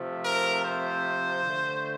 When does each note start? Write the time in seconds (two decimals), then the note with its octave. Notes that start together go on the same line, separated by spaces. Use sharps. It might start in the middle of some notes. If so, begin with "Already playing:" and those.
Already playing: C3 F3 A3
0.22 A#4
0.63 C5
1.45 D3 A3